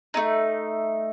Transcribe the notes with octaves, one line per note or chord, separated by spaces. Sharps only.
A3 C#4 D#4